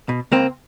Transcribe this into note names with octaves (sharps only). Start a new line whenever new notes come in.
B2
C#2 A#3 C4